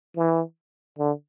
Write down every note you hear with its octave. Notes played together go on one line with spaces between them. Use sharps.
E3
D3